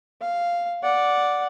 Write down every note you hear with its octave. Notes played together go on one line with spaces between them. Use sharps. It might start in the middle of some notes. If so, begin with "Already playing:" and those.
F5
D5 F#5